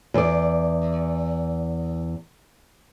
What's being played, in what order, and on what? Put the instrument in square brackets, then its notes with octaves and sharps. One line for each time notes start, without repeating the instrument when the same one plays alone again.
[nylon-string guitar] E2 D5